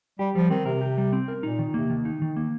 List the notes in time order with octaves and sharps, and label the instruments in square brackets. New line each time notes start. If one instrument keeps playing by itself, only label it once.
[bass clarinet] G3 [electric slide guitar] G4
[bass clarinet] F3 [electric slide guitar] G3
[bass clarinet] D#3 [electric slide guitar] C4
[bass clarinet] C3 [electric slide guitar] A#4
[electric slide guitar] G4
G3
C4
A#4
[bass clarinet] A#2 [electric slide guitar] D#4
[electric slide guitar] D#3
[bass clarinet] C3 [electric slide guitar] A#3
[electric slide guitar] D#3
D#4
D#3
A#3